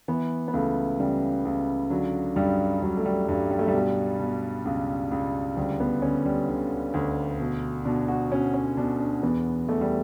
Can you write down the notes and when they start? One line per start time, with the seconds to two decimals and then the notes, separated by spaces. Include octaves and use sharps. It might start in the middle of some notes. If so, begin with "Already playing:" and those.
0.08 E3 B3
0.48 B3
0.53 C#2 A3
0.99 C#3 G3
1.45 C#2
1.90 D3 F#3
2.36 G2 G3
2.82 G2 F#3
2.97 A3
3.06 G3
3.29 G2 G3
3.51 G3
3.59 A3
3.68 G3
3.73 B2
4.19 B2
4.65 C#2
5.11 C#2
5.57 D2 G3
5.80 B3
6.02 D3 C#4
6.25 G3
6.49 D3
6.94 D2
7.40 B2
7.85 B2 D4
8.08 F#4
8.31 B2 C#4
8.54 C#4
8.77 B2 D4
9.00 D4
9.23 E2 B3
9.69 E2 A3
9.81 G3